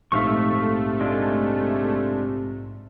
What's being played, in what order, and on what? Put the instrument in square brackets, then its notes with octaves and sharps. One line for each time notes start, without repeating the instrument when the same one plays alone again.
[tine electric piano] A#1 G#2 [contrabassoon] C3 [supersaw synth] A3 [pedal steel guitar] E5 F5 C#6
[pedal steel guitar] G#3 D4 F4